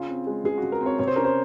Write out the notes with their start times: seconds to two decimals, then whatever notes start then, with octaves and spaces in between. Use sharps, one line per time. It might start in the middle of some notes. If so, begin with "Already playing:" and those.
Already playing: C#3 F4
0.09 C4
0.27 G#3
0.44 C#3 G#4
0.58 F#4
0.63 C#3
0.72 A#4
0.81 C4 C#5
0.99 C3 C#5
1.07 C5
1.16 C#4 A#4
1.24 C5